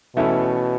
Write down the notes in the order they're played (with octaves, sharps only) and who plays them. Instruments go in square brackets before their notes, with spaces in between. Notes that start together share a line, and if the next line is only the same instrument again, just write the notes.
[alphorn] B2 [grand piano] E3 A3 C#4 E4 A4